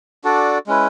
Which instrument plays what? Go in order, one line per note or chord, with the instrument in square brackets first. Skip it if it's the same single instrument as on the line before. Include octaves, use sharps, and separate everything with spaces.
[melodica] D4 F#4 A4 D5
G#3 C#4 E4 B4